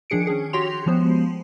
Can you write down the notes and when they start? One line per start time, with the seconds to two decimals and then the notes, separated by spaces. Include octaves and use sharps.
0.10 D#3 F3 D4 G#4 C#7 D7
0.27 C#4 G#4
0.53 F#4 G4 C#5 G5 C6 F7
0.86 F3 G#3 B3 C5